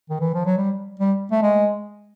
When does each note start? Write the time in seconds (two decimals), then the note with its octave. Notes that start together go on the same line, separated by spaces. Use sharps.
0.10 D#3
0.21 E3
0.34 F3
0.45 F#3
0.57 G3
1.00 G3
1.31 A3
1.42 G#3